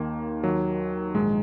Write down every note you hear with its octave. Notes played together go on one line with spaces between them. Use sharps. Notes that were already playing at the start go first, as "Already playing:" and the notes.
Already playing: D#2 D#3 A#3
D#2 D#3 F#3
A#1 G#2 D#3 G#3